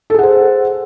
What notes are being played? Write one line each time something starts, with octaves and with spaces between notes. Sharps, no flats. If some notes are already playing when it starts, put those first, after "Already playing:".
G#4 A4 C5 F#5